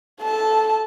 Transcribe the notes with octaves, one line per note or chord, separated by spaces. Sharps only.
A4 A5